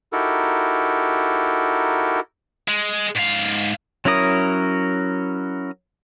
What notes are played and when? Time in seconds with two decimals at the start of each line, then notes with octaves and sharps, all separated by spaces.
0.13 D#4 E4 F#4 G4 A4 A#4
2.68 G#3
3.16 G#2 F5
4.05 F#3 C#4 E4 A#4 D#6